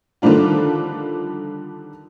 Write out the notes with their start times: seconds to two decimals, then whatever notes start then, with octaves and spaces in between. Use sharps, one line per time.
0.22 D3 D#3 F3 G3 D4 F4